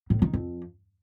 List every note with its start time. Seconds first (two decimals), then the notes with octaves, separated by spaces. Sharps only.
0.10 A2
0.22 D#3
0.33 F2